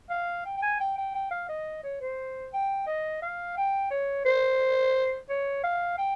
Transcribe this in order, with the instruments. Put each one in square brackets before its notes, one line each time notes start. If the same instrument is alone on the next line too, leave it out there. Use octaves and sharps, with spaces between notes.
[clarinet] F5
G5
G5
G#5
G5
G5
G5
F5
D#5
C#5
C5
G5
D#5
F5
G5
C#5
C5
C#5
F5
G5